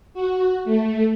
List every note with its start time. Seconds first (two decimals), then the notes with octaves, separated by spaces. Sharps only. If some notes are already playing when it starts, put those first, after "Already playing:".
0.14 F#4
0.64 A3